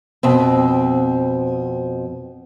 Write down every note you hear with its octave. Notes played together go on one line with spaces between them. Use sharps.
F2 B2 C4